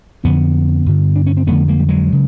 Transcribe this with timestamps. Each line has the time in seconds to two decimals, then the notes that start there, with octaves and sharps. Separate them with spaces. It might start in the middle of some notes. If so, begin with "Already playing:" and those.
0.24 F2 D3 B3 C#4
0.86 G2 D3
1.16 D4
1.26 C#4
1.37 C4
1.47 F2 D3 A3 B3
1.68 G#3 A#3
1.80 G3
1.89 F#3 G#3
2.12 C#3